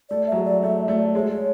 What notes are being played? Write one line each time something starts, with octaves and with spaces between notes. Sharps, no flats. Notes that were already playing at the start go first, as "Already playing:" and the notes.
A3 D5
F#3 E5
G#3
D5
A3 E5
A3 D5
G#3 C#5